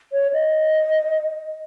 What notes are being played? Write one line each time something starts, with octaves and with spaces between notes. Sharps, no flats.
C#5
D#5